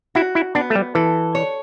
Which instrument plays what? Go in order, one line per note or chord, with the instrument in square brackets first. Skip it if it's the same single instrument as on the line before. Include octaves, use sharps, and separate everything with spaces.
[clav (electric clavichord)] E4 [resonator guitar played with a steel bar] F#4
[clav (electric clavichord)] E4
[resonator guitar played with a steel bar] B3 [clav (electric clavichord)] D4
[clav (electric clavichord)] A3
G3
[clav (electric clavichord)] E3 [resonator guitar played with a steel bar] A4
[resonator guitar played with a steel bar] C#5